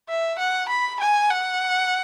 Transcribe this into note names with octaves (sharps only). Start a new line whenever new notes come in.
E5
F#5
B5
G#5
F#5